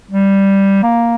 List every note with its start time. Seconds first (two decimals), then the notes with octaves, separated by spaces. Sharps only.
0.11 G3
0.83 A#3